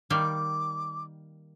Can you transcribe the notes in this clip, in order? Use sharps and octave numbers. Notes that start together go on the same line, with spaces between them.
D#3 G3 A#3 D6